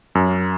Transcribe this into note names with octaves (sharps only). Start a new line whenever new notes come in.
F#2